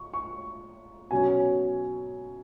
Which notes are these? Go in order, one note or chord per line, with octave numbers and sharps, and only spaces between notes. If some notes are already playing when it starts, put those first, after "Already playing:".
Already playing: C#6
C#6
B2 F#3 C#4 G#5